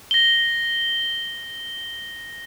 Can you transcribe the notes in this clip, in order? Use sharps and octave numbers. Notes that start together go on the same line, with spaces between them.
A#6 G7